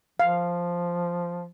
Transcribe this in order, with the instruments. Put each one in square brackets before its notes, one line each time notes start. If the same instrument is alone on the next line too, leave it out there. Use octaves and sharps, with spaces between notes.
[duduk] F3 [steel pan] F5